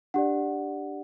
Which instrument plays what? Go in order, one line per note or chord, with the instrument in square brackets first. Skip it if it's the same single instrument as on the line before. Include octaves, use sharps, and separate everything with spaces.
[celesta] D4 G4 D5 F#5